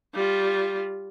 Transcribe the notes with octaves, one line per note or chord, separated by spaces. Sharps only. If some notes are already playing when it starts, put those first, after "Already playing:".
G3 F4